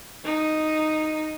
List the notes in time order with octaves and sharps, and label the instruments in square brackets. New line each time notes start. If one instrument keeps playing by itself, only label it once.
[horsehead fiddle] D#4